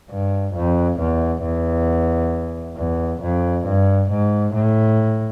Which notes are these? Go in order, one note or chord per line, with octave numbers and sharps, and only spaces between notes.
G2
F2
E2
E2
E2
F2
G2
G#2
A2